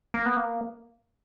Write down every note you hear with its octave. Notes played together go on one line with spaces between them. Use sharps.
A#3
B3
A#3